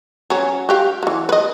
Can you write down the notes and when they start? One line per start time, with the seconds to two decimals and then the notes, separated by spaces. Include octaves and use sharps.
0.30 F#3 C#4
0.69 F#4 G4 F5
1.03 E3 F#3
1.29 B4 D#5